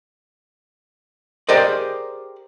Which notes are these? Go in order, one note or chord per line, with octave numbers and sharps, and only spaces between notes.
G4 G#4 A#4 C5 D5 D#5